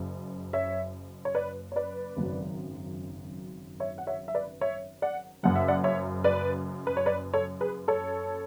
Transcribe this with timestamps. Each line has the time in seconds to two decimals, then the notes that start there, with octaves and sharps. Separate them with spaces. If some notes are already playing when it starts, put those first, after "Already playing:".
Already playing: F#1 F#2 C#3
0.53 C#5 E5
1.25 C#5
1.35 B4 D5
1.72 C#5
1.76 B4 D5
2.17 G#1 F#2 C#3 F#3
3.80 C#5 E5
3.98 F#5
4.07 C#5 E5
4.28 E5
4.35 B4 D5
4.61 C#5 E5
5.02 D5 F#5
5.43 F#1 F#2 C#3 F#3 F#5
5.56 E5
5.68 D5 F#5
5.84 C#5 E5
6.24 B4 D5
6.87 B4
6.97 C#5
7.06 B4 D5
7.34 A4 C#5
7.61 G#4 B4
7.88 A4 C#5